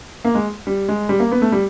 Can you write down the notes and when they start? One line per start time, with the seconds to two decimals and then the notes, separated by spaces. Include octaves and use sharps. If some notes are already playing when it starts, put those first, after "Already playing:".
0.25 A#3
0.35 G#3
0.67 G3
0.89 G#3
1.09 G3
1.20 A#3
1.32 B3
1.42 A3
1.52 G3